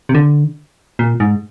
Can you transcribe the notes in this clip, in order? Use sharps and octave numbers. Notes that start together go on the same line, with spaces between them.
C3
D3
A#2
G#2